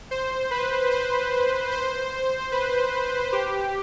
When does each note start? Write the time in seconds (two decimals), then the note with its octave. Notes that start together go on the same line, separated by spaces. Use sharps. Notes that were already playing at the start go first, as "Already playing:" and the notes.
0.11 C5
0.51 B4
0.91 C5
1.71 C5
2.52 B4
3.32 G4